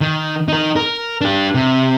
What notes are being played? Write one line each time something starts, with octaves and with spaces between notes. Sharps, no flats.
D#3
D#4 A#4
A#4
D4 G4
C3